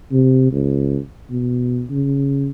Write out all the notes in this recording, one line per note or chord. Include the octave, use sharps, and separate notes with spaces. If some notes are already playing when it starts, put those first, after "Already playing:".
C3
C#2
B2
C#3